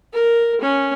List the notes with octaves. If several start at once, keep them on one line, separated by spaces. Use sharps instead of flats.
A#4
C#4